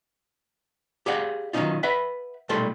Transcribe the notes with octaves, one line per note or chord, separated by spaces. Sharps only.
G4 G#4 D5 F5 F#5
D#3 F#3 G#3 C#4 D#4 F4
B4 E5 F#5 B5
B1 A#2 G3 A3 A4 C6